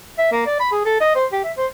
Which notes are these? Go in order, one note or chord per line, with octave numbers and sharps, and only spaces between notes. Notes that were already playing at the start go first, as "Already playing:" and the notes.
E5
A#3
D5
B5
G#4
A4
D#5
C5
G4
E5
C5